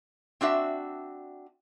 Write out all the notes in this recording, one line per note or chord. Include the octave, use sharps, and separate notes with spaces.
C4 D4 F#4 E5